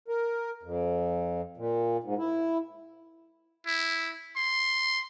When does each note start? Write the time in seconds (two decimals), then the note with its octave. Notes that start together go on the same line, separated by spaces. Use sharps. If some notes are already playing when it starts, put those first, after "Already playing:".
0.08 A#4
0.63 F2
1.57 A#2
2.04 G#2
2.18 E4
3.67 E4
4.37 C6